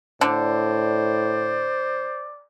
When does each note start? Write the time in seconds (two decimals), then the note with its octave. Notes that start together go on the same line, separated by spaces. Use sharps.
0.21 A2 D3 C5 D5